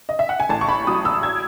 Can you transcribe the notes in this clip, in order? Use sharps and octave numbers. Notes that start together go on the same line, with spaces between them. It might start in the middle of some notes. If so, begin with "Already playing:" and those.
D#5
E5
F#5
G#5
A1 A5
C#6
B5
F#3 D#6
E6
G#6